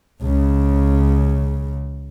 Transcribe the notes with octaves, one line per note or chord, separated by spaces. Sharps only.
C#2 C#3